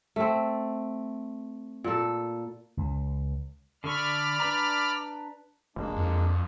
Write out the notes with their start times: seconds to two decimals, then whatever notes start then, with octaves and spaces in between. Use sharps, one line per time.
0.16 A3 C4
1.84 A#2 A4
2.77 C#2
3.84 D3 A4 D5 B5 C#6 F6
4.40 D4 B4 A#5
5.76 F1 G#3 A#3 D4
5.96 F2